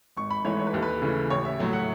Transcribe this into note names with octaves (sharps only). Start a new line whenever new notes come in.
G#1 C#6
B5
G#2 E3 A3 C#5
C#5
B4
D#2 A4
B4
C#3 E3 A3
A1 C#5
E5
A2 F#3 A3
F#5